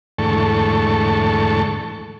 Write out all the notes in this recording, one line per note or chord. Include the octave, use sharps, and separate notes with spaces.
E2 G#2 D3 A3 A4 C#6